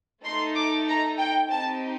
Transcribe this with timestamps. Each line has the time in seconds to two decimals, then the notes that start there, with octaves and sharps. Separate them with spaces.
0.24 A3 D#4 A4 C6
0.55 D6
0.88 A#5
1.19 G5
1.50 C4 D#4 G4 A5